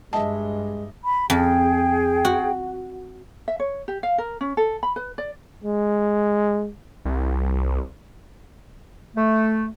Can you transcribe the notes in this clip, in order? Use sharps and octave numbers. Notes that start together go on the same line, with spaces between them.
G2 G#3 D#5 E5 A5
B5
F2 G#4 G5
F#4
E5
C#5
G4
F5
A#4
C#4
A4
B5
B4
D5
G#3
C2
A3